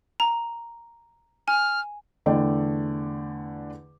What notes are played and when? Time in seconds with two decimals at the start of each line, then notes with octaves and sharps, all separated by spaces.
0.20 A#5
1.48 G#5 F6
2.26 E2 D3 A3 D5 G5